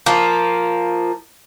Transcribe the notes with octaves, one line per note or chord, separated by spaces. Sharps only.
F3 A#3